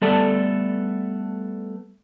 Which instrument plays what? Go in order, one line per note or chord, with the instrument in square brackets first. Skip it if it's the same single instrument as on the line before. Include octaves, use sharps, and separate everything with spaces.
[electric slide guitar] G3 A3 B3 A4 D5 A5